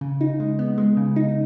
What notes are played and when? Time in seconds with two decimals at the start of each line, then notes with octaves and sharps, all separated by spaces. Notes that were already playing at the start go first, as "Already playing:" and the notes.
0.01 C#3
0.21 D#4
0.40 G#3
0.59 B3
0.78 G#3
0.97 C#3
1.16 D#4